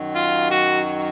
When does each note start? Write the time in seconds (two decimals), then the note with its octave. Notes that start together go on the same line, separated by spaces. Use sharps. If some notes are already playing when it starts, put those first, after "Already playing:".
Already playing: F#2 D#3 F#3
0.14 F4
0.50 F#4